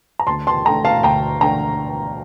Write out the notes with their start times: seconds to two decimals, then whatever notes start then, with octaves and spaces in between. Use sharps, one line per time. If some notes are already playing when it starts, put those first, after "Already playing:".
0.19 A#5
0.27 D2 A5 C6
0.47 A5 C6
0.65 D3 A3 G5 A#5
0.85 F5 A5
1.03 D2 G5 A#5
1.41 D3 A3 G5 A#5